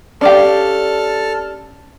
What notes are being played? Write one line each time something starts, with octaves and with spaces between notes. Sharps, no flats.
C#4 D4 G4 A4 D5 F5 A5 F6